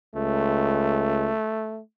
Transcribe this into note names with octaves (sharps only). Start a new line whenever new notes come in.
C#2 A3